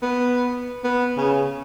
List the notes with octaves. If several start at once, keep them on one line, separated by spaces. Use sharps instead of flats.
B3
B3
C#3